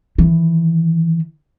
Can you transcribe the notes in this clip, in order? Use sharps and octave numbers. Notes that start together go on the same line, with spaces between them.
D#3 E3